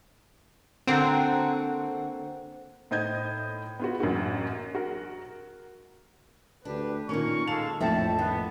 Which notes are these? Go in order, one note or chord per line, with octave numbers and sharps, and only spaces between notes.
D3 A#3 C4 F#4
A2 D#4 C5 D#5 G6 G#6
B3 F4 F#4
A1 F#2 A#3 F#4
F#4 A#4
D2 D4 G4 B4
A#2 D#3 A#3 C#4 A#4 C#6
G#3 A4 F5 A5 F7
A#1 F2 A2 F3 C4 A4 E5 A5
D#3 A3 B3